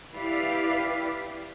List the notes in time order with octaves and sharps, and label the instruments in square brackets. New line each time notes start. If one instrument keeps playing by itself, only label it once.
[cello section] E4 G4 B4 D5 F5